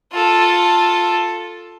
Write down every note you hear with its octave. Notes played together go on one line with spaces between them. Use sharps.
F4 A4